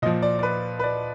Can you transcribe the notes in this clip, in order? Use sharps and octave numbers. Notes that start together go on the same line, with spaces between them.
A#2 F3 D#5
D5
D5
B4
B4
D5